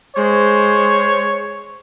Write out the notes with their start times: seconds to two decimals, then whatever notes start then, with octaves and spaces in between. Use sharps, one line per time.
0.17 G#3 C5 C#5